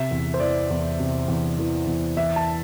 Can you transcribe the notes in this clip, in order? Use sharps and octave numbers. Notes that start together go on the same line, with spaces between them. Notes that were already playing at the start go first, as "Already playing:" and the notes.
Already playing: C3 E5
E2
C5
E3 D5
E2
C3
E2
E3
E2
E3 E5
A5